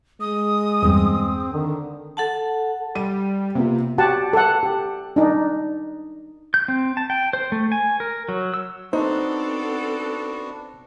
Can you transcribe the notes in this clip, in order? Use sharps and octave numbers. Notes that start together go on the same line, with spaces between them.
G#3 D#6
E2 G2 C4
D3 D#3
A4 F#5 A5
G3 D#7
C3 A#3 B3 F4
F#4 G4 F#5 A5
A4 F#5
G4
D4 D#4
G6
C4
A5
G5
C5
A3
G#5
A#4
F#3
E6
B3 C4 D4 D#4 F#4 A4 C5